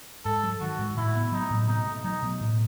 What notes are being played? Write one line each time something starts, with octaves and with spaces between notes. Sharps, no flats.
G#2 A4
F#3
D#3 F#4
G#2
A2 E4
B3
F#3 D#4
A2
B2 D#4
A3
F#3 D#4
B2
A2